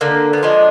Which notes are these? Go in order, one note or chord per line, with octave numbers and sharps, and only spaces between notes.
D3 A#3
B3
F3 G#3 D4